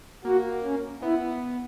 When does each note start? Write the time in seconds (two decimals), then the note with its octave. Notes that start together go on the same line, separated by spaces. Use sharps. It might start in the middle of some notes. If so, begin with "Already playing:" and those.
0.25 A#3 F#4
0.63 C#4
1.02 B3 E4